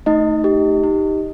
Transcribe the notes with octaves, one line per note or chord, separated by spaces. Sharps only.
A3 D#4 D#5
G4
D#4